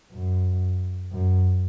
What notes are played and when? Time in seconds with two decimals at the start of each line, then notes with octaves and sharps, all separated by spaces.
0.12 F#2
1.11 F#2